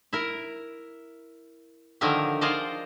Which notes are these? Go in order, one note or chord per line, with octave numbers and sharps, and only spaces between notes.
E4 A#4
D3 D#3 F3 F#3 A#4 E5
F4 G#4 A#4 C5 D5 D#5